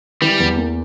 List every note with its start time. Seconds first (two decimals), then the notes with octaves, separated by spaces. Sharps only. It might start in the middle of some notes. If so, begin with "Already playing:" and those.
0.21 E3 G3
0.40 E2
0.58 A#3